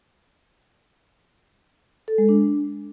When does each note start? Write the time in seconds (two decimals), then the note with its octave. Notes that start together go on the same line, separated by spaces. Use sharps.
2.08 A4
2.18 G#3
2.29 D4